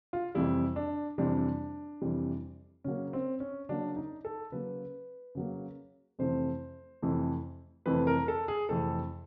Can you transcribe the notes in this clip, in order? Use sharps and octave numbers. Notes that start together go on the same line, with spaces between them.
F4
F2 C3 E3 G3 E4
D4
F2 C3 E3 G3 D4
F2 C3 E3 G3
C#3 F#3 A#3 C#4
C4
C#4
C#3 F#3 A#3 D4
D#4
A4
C#3 F#3 A#3 B4
C#3 F#3 A#3
F2 C3 E3 A3 C5
F2 C3 E3 A3
F2 C3 E3 A3 B4
A#4
A4
G#4
F2 C3 E3 A3 A4